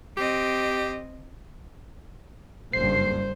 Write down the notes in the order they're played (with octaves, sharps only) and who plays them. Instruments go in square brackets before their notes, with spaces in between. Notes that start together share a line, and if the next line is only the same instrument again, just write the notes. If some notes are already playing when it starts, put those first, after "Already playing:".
[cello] C4 D#5 [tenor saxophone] G4
[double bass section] F#1 G2 [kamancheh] C5 [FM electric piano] C7